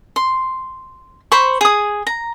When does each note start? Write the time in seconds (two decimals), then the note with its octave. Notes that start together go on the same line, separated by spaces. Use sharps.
0.16 C6
1.32 C5 B5 C#6
1.61 G#4 D#6
2.07 A#5